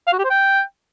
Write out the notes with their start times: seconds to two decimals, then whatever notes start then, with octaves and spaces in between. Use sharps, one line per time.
0.07 F5
0.13 F#4
0.19 G4
0.25 C5
0.30 G5